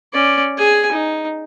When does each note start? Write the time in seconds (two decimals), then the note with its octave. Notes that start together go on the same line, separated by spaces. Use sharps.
0.13 C#4 D5
0.58 G#4 G#5
0.92 D#4